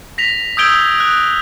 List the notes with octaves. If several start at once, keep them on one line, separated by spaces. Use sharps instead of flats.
A#6 B6 F7
D#6 E6 G6 G#6 D7 G7
F#6